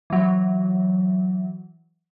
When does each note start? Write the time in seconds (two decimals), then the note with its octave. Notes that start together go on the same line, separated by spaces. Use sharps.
0.10 E3 F#3